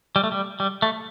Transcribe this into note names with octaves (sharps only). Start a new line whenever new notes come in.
G3
A3
G3
G3
A3